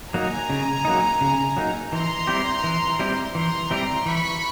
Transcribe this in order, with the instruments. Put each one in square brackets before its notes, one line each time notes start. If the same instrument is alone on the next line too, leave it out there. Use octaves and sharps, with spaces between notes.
[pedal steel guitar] F#3 A#3 D#4 [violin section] G#5 A#5
[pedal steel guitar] C#3
F#3 A#3 D#4
C#3
F#3 A#3 D#4
[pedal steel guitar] E3 [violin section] A#5 C6
[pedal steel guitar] G3 C4 E4 G4
E3
G3 C4 E4 G4
[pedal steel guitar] E3 [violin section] A#5 C6
[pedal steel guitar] G3 C4 E4 G4
[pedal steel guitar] E3 [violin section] B5 C#6